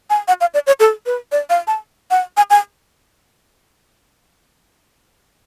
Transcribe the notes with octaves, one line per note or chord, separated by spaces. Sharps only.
G#5
F#5
F5
D5
C#5
A4
B4
D5
F5
A5
F#5
G#5
G#5